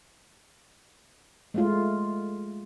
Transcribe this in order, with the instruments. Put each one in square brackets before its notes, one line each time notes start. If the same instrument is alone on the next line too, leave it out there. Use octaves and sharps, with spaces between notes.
[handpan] G#3 A3 F4